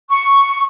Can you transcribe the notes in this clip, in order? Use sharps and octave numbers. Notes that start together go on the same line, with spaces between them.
C#6